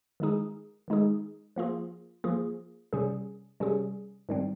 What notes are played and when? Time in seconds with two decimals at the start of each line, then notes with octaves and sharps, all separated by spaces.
0.20 D#3 G#3 D#4 G#4
0.88 D#3 G#3 D#4 G#4
1.56 F3 A#3 F4 G#4
2.24 F3 A#3 F4 G#4
2.93 C3 G3 C#4 G#4
3.60 C3 G3 C#4 G#4
4.29 G#2 D#3 G3 C4